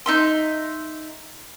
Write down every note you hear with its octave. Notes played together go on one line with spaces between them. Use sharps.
D#4 E5 C6